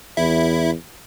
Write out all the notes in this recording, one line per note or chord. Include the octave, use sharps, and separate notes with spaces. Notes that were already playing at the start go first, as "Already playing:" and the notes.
E2 E4